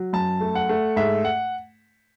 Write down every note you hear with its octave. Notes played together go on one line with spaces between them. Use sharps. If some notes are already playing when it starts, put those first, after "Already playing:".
Already playing: F#3
F#2 A5
A3
F#5
A3
G#2 E5
F#5